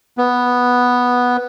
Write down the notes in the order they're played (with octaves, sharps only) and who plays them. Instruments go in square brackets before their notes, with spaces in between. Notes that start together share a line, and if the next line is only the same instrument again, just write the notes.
[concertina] B3